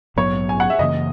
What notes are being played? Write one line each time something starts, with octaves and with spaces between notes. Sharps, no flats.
A#1 G#2 F#3 B3 C#5
G#5
F#5
E5
F#2 C#3 E3 A#3 D#5